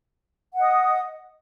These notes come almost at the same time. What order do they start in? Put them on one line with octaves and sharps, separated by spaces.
F#5 D#5 D#6